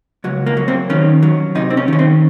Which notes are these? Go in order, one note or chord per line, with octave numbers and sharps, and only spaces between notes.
C#2 F#3
A#3
F#3
C4
D#3 C#4
F#3
C3 D#4
C4
C#4
D#3 C#4
C4